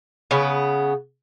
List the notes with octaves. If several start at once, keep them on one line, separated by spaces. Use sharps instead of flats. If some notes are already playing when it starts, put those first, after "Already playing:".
C#3 B3